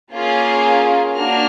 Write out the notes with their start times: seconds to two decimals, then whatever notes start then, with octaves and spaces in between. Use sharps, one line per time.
0.12 A#3 C#4 F4 G#4
1.15 A#3 D4 F#4 F6